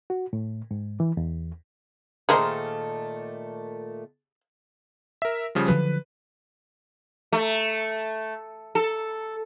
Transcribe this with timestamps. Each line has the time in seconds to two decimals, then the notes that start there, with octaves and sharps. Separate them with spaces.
0.10 F#4
0.33 A2
0.71 G#2
1.00 E3
1.17 E2
2.29 A#2 D#3 A3 G#4 A#4 C5
5.22 A#4 E5
5.55 C#3 F3 G3
5.68 D3 F3 F#3 B4
7.32 A3
8.75 A4